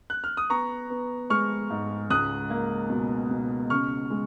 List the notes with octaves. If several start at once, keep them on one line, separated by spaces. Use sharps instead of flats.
F#6
F6
D#6
B3 A#5 C#6
B3
G#3 C#6 F6
G#2
C#2 D#6 F#6
A#3
B2
B2
C#3 C#6 F6
G#3